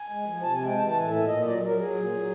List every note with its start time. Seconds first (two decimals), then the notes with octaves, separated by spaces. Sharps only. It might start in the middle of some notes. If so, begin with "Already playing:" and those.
Already playing: G#5
0.08 G#3
0.25 F3
0.42 C3 A5
0.54 G#5
0.60 G#3
0.65 G5
0.76 E3 A5
0.87 A5
0.94 A2
0.99 G#5
1.09 A#2 E5
1.26 A#2 D#5
1.43 F#3 D5
1.61 F#3
1.66 A#4
1.77 F#3 G#4
1.95 A#2
2.11 F#3